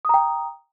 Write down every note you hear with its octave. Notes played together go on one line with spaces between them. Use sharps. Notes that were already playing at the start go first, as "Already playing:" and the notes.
G5 A#5 D#6